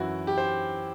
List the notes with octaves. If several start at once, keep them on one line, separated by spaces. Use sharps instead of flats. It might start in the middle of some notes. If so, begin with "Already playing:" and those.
Already playing: F#2 E3 E4 F#4
G4
C5